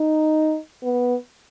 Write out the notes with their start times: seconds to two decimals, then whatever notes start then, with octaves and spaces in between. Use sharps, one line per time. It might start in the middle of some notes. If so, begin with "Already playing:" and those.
Already playing: D#4
0.83 B3